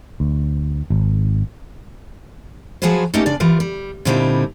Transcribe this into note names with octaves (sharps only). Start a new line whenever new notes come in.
D2
G#1
F3 F#3 F#4 G#4 B4 C5
A3 A#3 C#4 D#4 G4 D5
D2 C#3 D4 D5
E3 G3 F4 A#4 B4
G3
A#2 D3 G3 C4 D#4 E4